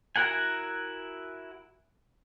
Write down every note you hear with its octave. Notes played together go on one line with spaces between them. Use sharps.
E4 F#4 A#4 F#5 G#5